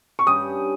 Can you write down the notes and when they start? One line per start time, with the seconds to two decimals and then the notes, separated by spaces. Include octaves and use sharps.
0.19 C#6
0.27 G2 G3 C#4 D#6